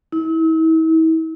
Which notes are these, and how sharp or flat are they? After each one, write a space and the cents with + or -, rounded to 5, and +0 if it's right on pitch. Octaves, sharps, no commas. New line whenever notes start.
E4 -40